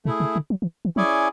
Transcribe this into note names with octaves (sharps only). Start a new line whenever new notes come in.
B2 A3 E4 G#4
C#3
D3
F#3
E3
E3
F#3 C#4 E4 G#4 D5 G#5